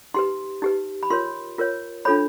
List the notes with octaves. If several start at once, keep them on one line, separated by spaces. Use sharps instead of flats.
D#4 G4 B4 C6
D#4 G4 B4
B5
F4 A#4 C#5 C6
F4 A#4 C#5
D4 F4 A4 C#5 B5